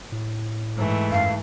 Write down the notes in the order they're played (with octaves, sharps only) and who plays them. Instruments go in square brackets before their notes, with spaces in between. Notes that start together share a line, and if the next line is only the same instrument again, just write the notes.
[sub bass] A2
[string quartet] G#2 E3 A3
[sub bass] F#2 [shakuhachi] F5